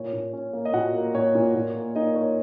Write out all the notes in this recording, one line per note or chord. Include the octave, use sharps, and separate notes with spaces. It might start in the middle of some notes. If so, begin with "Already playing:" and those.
Already playing: A#2 C#5
A#2
C#4
A#3
D#5
A#2 F#4 F#5
A#3
A#2 C#5
A#2
A#2
A#3
A#3 D#4 D#5
A#3 C#5